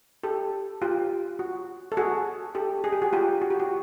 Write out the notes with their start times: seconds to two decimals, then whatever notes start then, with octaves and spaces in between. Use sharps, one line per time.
0.23 G4 A4
0.82 F4 G4
1.39 F#4
1.92 A4
1.97 F#4 G#4
2.55 G4 A4
2.84 G#4
2.92 G4
3.02 F#4 G#4
3.13 F4 G4
3.42 F#4
3.50 G4
3.60 F#4